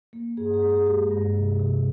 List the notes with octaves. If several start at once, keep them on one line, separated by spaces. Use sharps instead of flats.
A#3
G2 G#4
G#4
G#3
G#4
G#3 G4
G2
C3
C3